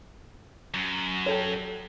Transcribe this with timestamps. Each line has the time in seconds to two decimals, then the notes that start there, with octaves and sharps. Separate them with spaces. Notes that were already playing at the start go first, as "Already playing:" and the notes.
0.74 F#2
1.26 G4 A4 C#5